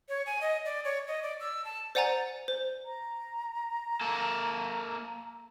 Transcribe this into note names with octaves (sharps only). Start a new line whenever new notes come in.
C#5
G#5
D#5
D5
C#5
D#5
D5
E6
A5
C5 D5 F#5 G#5 A#5 A6
C5
A#5
A#3 A4